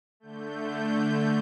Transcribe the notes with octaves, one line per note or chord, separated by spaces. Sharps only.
D3 A3 G6